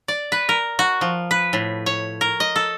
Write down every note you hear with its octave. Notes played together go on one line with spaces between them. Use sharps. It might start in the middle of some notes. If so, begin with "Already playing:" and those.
D5
B4
A#4
F#4
F3
B4
A2
C#5
A#4
D#5
A4